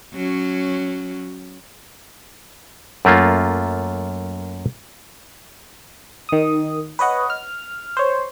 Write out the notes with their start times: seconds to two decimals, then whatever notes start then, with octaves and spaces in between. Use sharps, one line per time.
0.13 F#3 C#4
3.05 F#2 A3 A#3 F4
6.29 D#3 D#6
6.99 B4 C#5 D#5 F#5
7.30 F6
7.97 C5 C#5